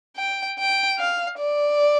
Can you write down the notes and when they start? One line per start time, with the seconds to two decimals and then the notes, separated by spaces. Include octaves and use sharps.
0.17 G5
0.59 G5
0.99 F5
1.39 D5